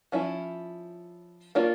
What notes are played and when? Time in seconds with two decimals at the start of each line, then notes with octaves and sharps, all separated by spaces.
0.12 F3 C#4 E4
1.55 A#3 D4 F4 C#5